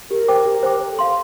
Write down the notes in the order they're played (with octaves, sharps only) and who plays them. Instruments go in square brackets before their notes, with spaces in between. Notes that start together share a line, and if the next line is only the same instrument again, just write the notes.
[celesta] G4 [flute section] A#4
[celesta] C5 G5 D6
G4
C5 G5 D6
[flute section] A#4 [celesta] C5
[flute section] A4
[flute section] G4 [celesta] F5 C6